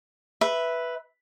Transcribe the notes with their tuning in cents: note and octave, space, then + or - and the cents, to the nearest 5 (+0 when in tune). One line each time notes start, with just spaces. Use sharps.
B4 +0 E5 +0